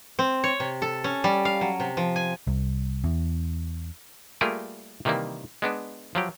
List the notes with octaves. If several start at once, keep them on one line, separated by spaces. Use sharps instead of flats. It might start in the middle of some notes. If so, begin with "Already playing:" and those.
C4
C#5
C3
A4
C#4
G3
F5
F#3
C3
F3
G#5
C2
E2
G3 A3 A#3 F4 G#4 A#4
C3 D#3 E3 G3 A#3
G#3 B3 D4
F3 F#3 G4